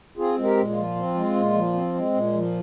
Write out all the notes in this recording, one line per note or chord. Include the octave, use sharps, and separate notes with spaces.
C4 F4 G#4
G#3
G4 A#4
A#2
F4
F3
C4
G#3
A#2
F3
C4
G#3
A#2
F3